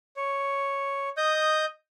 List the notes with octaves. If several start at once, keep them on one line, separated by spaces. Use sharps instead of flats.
C#5
D#5 D#6 G6